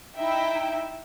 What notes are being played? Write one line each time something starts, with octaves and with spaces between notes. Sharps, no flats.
D#4 E4 E5 G5